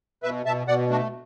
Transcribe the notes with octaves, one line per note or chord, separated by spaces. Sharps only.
B2 B4 E5
B2 E5 A5
B2 D5 F#5
A3 D4 F#4